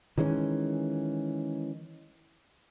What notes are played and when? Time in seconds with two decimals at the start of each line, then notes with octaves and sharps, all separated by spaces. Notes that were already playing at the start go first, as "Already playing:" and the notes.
0.18 D#3 E3 G#3 C#4